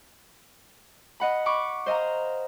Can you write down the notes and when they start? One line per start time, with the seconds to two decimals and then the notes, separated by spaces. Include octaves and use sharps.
1.20 D#5 F#5 B5
1.46 B5 C#6 D6
1.86 C5 D#5 F5 A#5